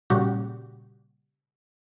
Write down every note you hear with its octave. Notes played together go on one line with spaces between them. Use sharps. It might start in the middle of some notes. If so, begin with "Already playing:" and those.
A#2 C#3 G3 F#4 G4